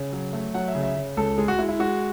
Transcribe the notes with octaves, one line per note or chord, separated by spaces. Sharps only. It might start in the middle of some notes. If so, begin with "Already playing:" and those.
Already playing: C#3
F#3
A3
F#3 F#5
E5
C#3
E5
C#3
C#2 A4
G#3 G#4
F#4
G#3 E4
E4
G#3 F#4